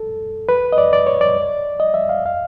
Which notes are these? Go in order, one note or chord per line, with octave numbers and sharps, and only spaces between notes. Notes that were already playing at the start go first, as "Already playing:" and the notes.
Already playing: A4
B4
D#5
D5
D5
C#5
D5
D#5
E5
F5
F5